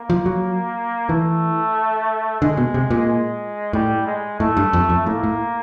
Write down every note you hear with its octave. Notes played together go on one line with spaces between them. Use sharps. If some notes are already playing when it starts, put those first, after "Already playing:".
Already playing: A#3
F3
F#3
E3 A3
D3 G#3
B2
C3
A#2
G#3
A2 G3
G#3
A2 A3
G2
F2
F2
A2 A#3
A2